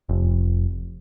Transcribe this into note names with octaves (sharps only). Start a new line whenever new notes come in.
F1